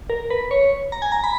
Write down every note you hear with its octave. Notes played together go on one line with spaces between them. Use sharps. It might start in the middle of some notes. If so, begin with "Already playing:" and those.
A#4
B4
C#5
A#5
G#5
A#5
B5